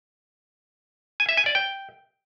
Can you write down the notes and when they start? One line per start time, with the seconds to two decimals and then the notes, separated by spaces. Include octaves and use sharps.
1.20 G#5
1.29 E5
1.37 G#5
1.46 D5
1.55 G5